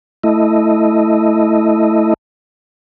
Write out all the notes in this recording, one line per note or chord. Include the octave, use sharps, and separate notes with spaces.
A3 E4 D#5